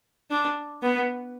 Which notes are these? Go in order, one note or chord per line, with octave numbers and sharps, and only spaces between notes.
D4
B3